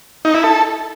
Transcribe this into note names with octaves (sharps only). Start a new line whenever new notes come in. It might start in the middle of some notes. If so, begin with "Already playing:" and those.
D#4
E4
A4